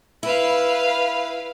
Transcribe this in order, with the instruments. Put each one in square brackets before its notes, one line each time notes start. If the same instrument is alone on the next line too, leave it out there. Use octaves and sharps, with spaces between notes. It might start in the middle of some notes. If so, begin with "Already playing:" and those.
[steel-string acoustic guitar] E4 [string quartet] B4 F5